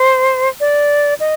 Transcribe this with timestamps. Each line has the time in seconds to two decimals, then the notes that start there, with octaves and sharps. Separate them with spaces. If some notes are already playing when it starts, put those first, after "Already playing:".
Already playing: C5
0.60 D5
1.20 D#5